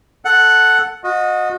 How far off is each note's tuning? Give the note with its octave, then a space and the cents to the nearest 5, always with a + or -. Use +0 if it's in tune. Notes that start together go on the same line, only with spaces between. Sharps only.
A4 +0 F#5 +0
F#4 -30 D#5 +0